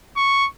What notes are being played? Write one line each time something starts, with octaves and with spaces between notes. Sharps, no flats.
C#6